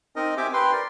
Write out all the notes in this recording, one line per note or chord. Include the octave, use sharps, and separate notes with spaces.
C4 D#4 A#4 D#5
C4 G4 E5 G5 G#5 D6
B4 G5 C6
A#4 D5